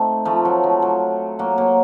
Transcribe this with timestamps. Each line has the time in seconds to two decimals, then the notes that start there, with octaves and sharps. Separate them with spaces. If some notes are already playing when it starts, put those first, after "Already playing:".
Already playing: A3 C4 D#4
0.25 F3 A3
0.45 F#3
0.64 F3
0.82 F#3
1.39 F#3 A#3
1.58 F#3 A#3